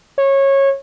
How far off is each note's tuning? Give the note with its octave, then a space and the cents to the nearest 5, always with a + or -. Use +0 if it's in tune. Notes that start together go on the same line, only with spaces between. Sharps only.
C#5 -20